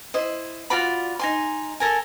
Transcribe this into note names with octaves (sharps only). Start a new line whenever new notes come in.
E4 C5 D#5
F4 F#4 D5 B5
D#4 G#5 C6
A4 A#4 G#5